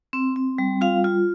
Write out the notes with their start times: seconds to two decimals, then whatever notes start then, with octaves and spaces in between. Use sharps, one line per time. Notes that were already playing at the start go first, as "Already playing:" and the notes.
0.13 C4
0.36 C4
0.58 G3
0.81 F4 F5
1.04 F4